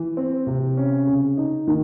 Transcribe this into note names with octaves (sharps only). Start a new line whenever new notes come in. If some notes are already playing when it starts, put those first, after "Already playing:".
Already playing: E3
C4
C3
C#4
C#3
D#4
D#3